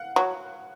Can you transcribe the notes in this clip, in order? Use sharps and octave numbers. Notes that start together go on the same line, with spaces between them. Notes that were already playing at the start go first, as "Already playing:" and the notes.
Already playing: F5 F#5
F#3